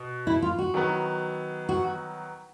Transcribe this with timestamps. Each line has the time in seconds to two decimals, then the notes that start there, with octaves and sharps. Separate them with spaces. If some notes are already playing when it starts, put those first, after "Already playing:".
Already playing: B2
0.27 E4
0.42 F4
0.58 F#4
0.74 D#3 F#3 B3
1.69 F#4